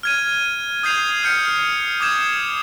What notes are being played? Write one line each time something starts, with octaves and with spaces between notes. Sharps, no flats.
F6 G#6 D#7
D#6 G6 G#6 C7 D#7 F7
F6 G6 C#7
D6 D#6 G6 G#6 E7